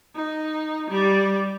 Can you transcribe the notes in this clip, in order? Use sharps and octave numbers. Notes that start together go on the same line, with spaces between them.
D#4
G3 D5